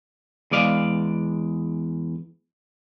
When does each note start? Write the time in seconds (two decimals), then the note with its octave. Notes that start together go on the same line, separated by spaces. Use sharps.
0.51 E2 G#3 D5 F5